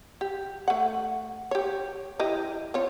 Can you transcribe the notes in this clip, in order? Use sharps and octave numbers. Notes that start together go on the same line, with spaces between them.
G4
A3 F#5
G4 C#5
E3 G4 D#5
C4 F4 C#5